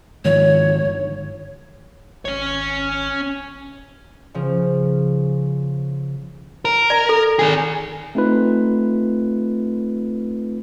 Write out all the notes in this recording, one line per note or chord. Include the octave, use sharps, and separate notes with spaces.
G#2 D#3 F3 C#5
G1
G#1 C#4 C#5
C#3 F3
A#4
D5 A#5
A4
D#3 G#4
A3 C4 D#4 F4 B4